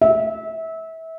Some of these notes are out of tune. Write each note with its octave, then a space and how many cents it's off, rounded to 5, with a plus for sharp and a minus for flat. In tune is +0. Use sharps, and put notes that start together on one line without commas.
E5 -25